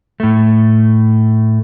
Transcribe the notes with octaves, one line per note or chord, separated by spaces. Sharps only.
A2 A3